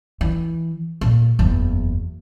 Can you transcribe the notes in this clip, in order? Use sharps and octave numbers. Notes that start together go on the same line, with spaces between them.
E3
A#2
F#1 E2